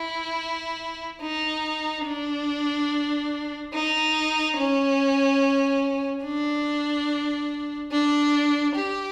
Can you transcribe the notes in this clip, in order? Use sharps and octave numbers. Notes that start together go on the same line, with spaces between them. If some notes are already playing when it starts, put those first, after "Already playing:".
Already playing: E4
D#4
D4
D#4
C#4
D4
D4
G4